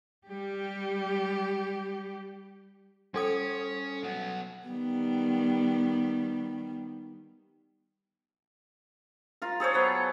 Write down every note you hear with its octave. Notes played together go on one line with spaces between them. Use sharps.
G3 G4
G3 C#4 A4 D#6
F#3 B3
D#3 G3 B3
F4 A#4
G#4 A4 C5 C#5
F#3 B3